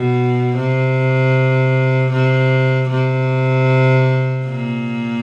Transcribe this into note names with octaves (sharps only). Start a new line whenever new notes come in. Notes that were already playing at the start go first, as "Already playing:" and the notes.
Already playing: B2
C3
C3
C3
A#2